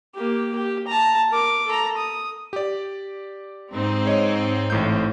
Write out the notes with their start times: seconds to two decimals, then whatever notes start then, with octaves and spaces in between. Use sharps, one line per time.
0.15 A#3 G4
0.55 G4
0.87 A5 A#5
1.31 A#4 D6
1.67 A4 A#5
1.97 D#6
2.53 G4 D5
3.72 G#2 C4 D#4
4.05 G#3 C#5 D#5
4.70 A1 A2 G6